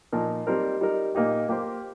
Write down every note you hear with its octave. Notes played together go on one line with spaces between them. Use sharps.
A#2 F3 D#4 A#4
G3 C4 D#4 A#4
G3 D#4 A#4
A#2 A#3 D#4 G4
A#3 G4 C5